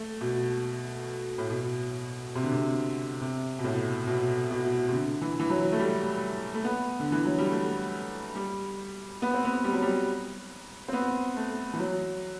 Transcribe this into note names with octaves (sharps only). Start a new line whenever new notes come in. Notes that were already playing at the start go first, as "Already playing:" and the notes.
Already playing: A3
B2
A2
B2
C3
D3
C3
C3
B2
A2
B2
B2
C3
D3
E3
E3
F#3
A3
G3
A3
B3
D3
E3
F#3
G3
A3
G3
B3
C4
B3
G3
F#3
G3
C4
B3
A3
E3
F#3